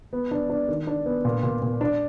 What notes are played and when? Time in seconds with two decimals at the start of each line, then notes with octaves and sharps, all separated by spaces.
0.13 B3
0.31 D4
0.50 D4
0.69 D#3
0.87 D4
1.06 B3
1.25 A#2
1.43 A#2
1.62 A#2
1.81 D4